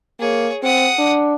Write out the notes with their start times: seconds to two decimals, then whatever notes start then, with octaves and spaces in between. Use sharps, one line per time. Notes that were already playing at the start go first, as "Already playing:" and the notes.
0.20 A#3 G#4 C#5
0.63 C4 F#5 D#6
0.99 D4